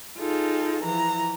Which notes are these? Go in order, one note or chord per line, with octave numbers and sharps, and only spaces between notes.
D#4 F4 G#4 A4
E3 F3 A#5